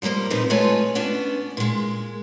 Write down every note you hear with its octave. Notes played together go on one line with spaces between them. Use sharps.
F3 G3 G#3 A#3 C5
A#2 F3 C4 D#4 B4
G#3 A3 F4 B4 C#5 G#5
B3 C#4 D4
A#2 G#3